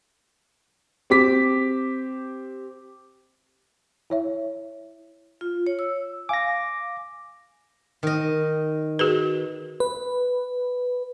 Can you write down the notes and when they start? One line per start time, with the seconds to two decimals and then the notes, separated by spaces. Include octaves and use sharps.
1.10 C4 G4 D6 B6
4.10 E4 C#5 E5
5.41 F4
5.67 C#5
5.79 E6
6.29 F5 G#5 D6 A#6
8.03 D#3 D#5
8.99 F#4 G#4 B4
9.80 B4